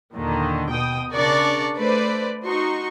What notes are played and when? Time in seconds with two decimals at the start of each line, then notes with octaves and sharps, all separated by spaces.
0.14 D#2 A#2 D3 D#3
0.69 B2 G5 D#6
1.13 C#3 D4 A#4 D5 C#6
1.78 A3 B4 C5 D5
2.45 D#4 F#4 C6 C#6